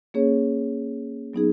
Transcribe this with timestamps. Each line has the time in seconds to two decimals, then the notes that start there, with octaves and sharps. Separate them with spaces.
0.14 A#3 C#4 G#4 C#5
1.34 F#3 B3 D#4 G#4